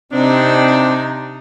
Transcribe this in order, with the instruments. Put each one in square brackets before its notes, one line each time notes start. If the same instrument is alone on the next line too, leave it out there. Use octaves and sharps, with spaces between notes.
[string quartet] C3 D#4 [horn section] C4 D4